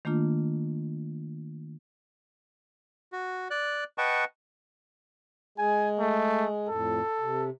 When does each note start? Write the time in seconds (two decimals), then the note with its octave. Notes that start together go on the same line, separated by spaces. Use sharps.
0.05 D#3 A3 A#3 D4 F4
3.12 F#4
3.50 D5 F#6
3.98 B4 D#5 F#5 G5 A5 C#6
5.58 G#3 G#4 G#5
5.99 A3
6.68 F2 A2 A4
7.20 C3